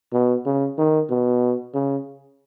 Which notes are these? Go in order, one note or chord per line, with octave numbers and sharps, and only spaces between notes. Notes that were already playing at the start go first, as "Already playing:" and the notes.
B2
C#3
D#3
B2
C#3